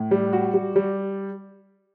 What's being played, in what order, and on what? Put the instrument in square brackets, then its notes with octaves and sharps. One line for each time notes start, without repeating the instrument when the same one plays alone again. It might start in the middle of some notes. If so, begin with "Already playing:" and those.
Already playing: [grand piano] A2
G3
F#4
G3
G3